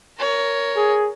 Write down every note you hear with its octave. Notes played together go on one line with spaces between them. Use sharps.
A#4 C#5
G#4